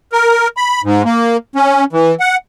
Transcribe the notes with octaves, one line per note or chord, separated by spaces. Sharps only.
A#4
B5
G#2
A#3
C#4
E3
F#5